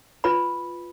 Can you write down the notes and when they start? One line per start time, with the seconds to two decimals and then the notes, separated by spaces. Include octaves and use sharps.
0.24 F4 B4 B5